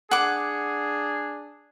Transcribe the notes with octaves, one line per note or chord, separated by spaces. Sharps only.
D4 G#4 F#5 D6